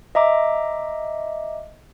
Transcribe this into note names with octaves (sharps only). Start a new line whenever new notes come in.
D#5 E5 A#5 D6